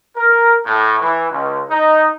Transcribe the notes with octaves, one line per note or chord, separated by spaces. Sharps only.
A#4
A2
E3
C#2
D#4